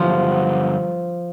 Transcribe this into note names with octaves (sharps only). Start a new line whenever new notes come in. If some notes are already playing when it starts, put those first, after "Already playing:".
Already playing: G2 D3 F3 F#3